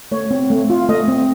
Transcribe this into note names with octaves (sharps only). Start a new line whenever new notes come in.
A3 C#5
C4
A3
F4
A3 D#5
C4